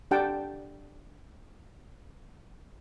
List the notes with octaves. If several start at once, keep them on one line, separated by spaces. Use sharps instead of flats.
D4 G4 F#5 G5 A5